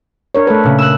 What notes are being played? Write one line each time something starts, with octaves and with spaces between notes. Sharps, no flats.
D4 A#4 C#5
A3 A4 B4
A#2 C#3
E6 F#6